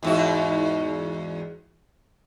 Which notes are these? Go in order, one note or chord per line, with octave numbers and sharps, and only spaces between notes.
E2 G#2 F#4